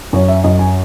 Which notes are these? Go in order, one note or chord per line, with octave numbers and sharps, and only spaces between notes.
F#2 C#5
E5
F#2 D#5
G#5